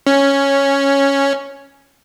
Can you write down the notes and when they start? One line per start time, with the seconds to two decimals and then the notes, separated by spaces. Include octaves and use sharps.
0.07 C#4